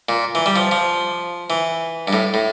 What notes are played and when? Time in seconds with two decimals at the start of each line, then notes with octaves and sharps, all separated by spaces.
0.09 A#2
0.35 E3
0.46 G3
0.56 F3
0.71 F3
1.50 E3
2.07 G2
2.13 A2
2.34 A2